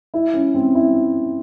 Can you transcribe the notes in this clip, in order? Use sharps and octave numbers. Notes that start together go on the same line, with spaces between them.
E4
C#4
C4
E4